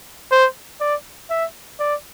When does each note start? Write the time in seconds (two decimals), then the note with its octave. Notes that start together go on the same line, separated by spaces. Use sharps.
0.32 C5
0.80 D5
1.30 E5
1.80 D5